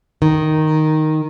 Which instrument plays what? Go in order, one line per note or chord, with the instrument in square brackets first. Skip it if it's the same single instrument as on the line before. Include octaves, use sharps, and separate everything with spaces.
[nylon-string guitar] D#3